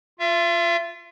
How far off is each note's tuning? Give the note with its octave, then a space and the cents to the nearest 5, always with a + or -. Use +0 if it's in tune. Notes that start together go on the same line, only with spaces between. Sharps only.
F4 +0 E5 +45